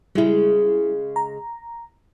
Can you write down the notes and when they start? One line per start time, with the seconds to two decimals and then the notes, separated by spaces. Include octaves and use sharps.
0.15 C#3 G3 G#3 E4
1.16 A#5